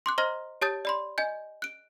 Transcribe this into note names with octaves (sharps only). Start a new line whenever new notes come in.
C6 D6 F#6
C5 D#5 A#5 C6 F6 A#6
G4 C#5 A5 D#6 G6 A6
D5 B5 C6
D#5 G#5 G6
F#6 D7